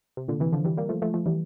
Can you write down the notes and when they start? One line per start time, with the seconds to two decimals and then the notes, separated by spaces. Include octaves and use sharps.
0.17 C3
0.28 A#2 D3
0.40 C3 E3
0.52 D3 F3
0.65 E3 G3
0.77 G3 A#3
0.89 F3 A3
1.02 F3 A3
1.14 F3 A3
1.26 E3 G3